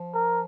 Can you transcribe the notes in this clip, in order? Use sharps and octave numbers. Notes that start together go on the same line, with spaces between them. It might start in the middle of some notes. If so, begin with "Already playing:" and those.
Already playing: F3
A#4